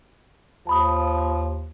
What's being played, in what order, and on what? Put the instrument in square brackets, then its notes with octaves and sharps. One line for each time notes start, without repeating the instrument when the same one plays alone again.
[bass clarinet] D#2 [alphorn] F3 [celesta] A5 B5 D#6